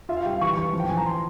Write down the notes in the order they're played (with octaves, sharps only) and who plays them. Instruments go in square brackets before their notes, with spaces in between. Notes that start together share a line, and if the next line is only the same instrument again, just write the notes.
[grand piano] F4 [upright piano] E5
[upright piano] F5
[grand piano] G3 [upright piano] G5
[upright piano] F5
[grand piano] E3 [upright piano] C#6
[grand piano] E3 [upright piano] C#6
[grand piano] F3
[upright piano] G5
[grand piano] F3 [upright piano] G#5
[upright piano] A#5
C6